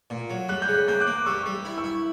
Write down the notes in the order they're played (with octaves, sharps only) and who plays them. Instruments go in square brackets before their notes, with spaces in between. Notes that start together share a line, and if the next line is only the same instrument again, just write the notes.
[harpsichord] A#2
F#3
[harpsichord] G3 [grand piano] F#6
[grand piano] G6
[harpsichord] C#3
[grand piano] F#6
[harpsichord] A#3 [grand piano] G6
[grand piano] D6 F#6
[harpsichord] A#3
[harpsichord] G3 [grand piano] C#6 E6
[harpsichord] G3
E4
[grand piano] C#6 E6
[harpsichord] E4